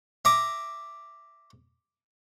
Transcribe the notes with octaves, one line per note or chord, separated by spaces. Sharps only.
E5 A#5 D6